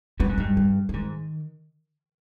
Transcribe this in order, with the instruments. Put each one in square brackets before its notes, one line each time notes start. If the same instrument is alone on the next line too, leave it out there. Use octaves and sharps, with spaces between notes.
[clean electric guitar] G2 [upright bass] B3
[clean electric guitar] G#2
[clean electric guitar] G2 [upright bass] G#3
[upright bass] G3
F3
[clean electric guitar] G#2 [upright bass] D#3